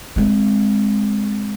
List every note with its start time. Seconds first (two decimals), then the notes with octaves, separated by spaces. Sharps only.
0.16 G#3 C4